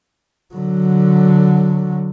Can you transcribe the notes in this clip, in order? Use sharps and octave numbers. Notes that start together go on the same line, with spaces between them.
D3 F#3